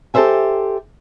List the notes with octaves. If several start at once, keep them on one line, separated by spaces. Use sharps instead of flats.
G4 A4 B4 C5 E5 G#5